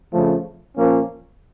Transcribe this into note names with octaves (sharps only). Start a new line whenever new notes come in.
F2 C#3 F3 A3
A#2 F3 A#3 C#4